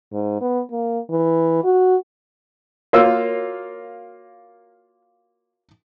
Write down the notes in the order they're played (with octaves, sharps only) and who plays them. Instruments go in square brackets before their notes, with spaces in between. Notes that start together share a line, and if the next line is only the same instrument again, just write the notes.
[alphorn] G#2
B3
A#3
E3
F#4
[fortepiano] A#3 F4 E6 [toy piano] F#4 A#4 C#5